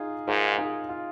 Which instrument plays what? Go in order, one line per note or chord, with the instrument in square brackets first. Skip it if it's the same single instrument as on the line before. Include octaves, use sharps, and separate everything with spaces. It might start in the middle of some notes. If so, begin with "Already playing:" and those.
Already playing: [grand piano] D#4 F4 G#4
[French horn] G#2 [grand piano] F4 A#4
[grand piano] D#4 G#4
F4